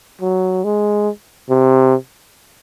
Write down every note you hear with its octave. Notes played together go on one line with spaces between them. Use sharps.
F#3
G#3
C3